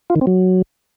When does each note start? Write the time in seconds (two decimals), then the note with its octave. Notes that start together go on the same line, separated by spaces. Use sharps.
0.10 F4
0.16 D#3
0.21 C4
0.27 F#3